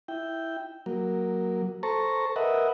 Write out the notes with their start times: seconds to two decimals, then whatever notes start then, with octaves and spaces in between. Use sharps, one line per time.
0.08 E4 G5
0.86 F#3 A#3
1.83 A4 C5 A5 A#5 C#6
2.36 A#4 B4 D#5 E5 F#5